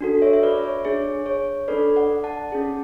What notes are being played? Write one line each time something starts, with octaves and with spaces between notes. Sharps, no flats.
D4 F#4 A4
C#5 E5
E5
B4 D5
C#5
D4 G#4 C#5
C#5
D4 A4 B4 D5
D5 F#5
F#5 A5
C#4 G#4